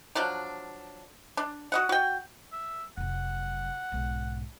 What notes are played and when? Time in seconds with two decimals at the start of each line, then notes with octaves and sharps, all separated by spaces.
0.15 F3 F#3 D4
1.37 D4
1.72 F#4 D#5 F#5
1.89 F#4 G5
2.52 E5
2.97 F1 F#3 F#5
3.92 B1 G#2